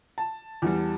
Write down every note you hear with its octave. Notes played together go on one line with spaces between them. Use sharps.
A5
E2 E3 G3